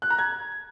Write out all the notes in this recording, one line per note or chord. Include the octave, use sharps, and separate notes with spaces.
F#6
A#5
G#6